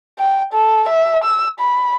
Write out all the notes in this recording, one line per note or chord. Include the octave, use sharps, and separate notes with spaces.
G5
A4
E5
E6
B5